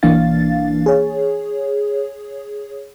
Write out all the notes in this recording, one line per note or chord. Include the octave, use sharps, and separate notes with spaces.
B1 E3 A#3 D4 F5 A6
G#4 C#5